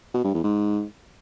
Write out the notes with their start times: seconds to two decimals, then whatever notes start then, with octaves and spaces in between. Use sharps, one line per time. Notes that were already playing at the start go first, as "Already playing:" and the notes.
0.14 B2
0.24 G2
0.34 E2
0.44 G#2